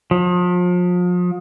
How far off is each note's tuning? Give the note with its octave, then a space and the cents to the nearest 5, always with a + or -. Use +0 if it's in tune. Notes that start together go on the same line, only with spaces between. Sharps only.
F3 +35